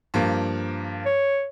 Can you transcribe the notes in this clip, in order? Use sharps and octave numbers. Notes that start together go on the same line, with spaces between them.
G2 F3 A#3
C#5